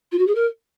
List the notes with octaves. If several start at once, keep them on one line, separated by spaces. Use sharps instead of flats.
F4
F#4
G#4
A#4